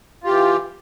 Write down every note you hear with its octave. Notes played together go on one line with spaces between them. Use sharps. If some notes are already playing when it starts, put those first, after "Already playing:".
E3 F4 G4